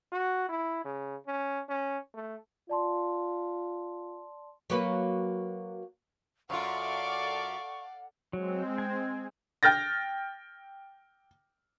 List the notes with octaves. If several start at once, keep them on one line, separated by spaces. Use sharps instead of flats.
F#4
E4
C#3
C#4
C#4
A3
F4 D5 A5 C6
F#3 A#3 B4
F#2 F4 A4 D5 F5 F#5 C#6
F#3 G#3 C4
G#5
G5 F6 G6 A6 A#6